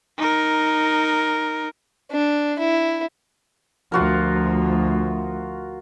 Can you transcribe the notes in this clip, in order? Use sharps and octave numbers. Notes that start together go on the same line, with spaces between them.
D#4 A#4
D4
E4
D2 F3 F4 F#4 A#4